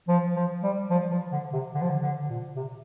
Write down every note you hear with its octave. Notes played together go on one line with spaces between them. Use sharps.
F3
F3
G3
F3
F3
D3
C3
D3
F3
D3
D3
A#2
C3